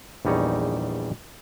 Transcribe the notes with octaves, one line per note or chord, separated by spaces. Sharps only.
A#1 E2 G3 D#4 C#5